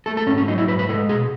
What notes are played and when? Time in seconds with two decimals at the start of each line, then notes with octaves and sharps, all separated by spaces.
0.06 A3 A4
0.17 A4
0.27 G#2 C#4
0.37 C#4
0.48 F#3 D#4
0.58 E4
0.68 G#2 B4
0.79 B4
0.89 G#3 A4
1.09 B2 G#4